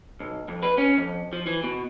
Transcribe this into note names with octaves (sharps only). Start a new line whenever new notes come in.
B1
F2
B4
C#4
F2
F3
E3
B2